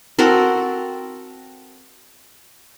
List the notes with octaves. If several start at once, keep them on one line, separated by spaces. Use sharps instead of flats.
C4 F#4 A4 A#4